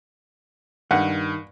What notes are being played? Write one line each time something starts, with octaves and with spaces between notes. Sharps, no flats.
G2 D#3 F#5